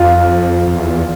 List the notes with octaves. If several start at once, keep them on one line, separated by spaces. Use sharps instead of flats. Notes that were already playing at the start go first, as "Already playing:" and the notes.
Already playing: F2 F4
F2
E2